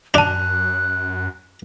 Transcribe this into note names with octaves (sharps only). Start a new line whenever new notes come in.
F#2 D4 A5 F#6 F7